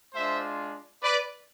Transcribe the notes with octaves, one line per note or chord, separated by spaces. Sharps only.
G#3 D4 F4 C5 E5
B4 D5